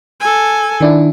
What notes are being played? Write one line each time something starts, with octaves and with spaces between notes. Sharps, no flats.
A4 G#5
D#3 D4 E4